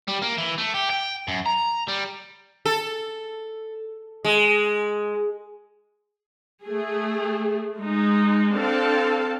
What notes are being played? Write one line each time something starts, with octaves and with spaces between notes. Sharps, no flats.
G3
A#3
E3
A3
G4
G5
F#2
A#5
G3
A4
G#3
A3 G#4
G#3 D#4
C4 D4 A4 F5 A5